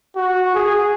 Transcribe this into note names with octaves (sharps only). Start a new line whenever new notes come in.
F#4
G#4